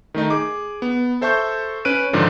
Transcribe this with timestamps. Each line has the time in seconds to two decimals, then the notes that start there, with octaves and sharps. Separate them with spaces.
0.14 D#3 A3 D#4
0.30 G#4 D6
0.82 B3
1.21 A4 C5 E5 A5 C#6 G6
1.85 C#4 B4 F#6 D7 D#7
2.13 G#2 D3 D#3 F3